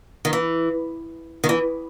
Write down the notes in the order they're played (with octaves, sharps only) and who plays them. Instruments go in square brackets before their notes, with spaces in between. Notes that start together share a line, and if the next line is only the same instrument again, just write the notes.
[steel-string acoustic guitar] D#3
E3
D#3
E3